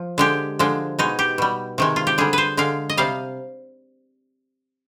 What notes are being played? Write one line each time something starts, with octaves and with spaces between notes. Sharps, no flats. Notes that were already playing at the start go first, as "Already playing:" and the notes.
Already playing: F3
D3 G#3 G4
D3 F3 G#3
B2 G#3 D#4
G4
B2 G3
C3 D#3 G#3
F4
G4
D3 G3 G#4
B4 C5
D3 G#3 F5
D#5
C3 G3 F5